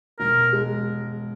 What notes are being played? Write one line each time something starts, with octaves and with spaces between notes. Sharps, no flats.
E1 A#4
G#3